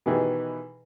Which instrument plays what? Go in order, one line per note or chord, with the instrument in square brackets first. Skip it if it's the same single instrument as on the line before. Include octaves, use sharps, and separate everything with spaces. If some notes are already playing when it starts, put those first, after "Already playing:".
[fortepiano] B2 D#3 E3 G4 G#4 B4